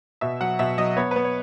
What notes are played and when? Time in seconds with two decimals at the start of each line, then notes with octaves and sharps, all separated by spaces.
0.21 B2 E5
0.41 F#3 F#5
0.59 B2 E5
0.78 F#3 D#5
0.97 B3 C#5
1.11 B3 B4
1.24 C#5